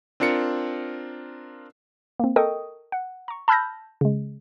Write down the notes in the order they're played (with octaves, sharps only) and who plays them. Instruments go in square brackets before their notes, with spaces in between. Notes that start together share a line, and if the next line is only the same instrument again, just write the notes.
[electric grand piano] C4 D4 F4 A#4 C#7
[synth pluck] A#3 C4
A4 A#4 D#5 G5 C#6 D#6
F#5
A#5 C#6
A5 B5 E6 F6 G6 A#6
C#3 G#3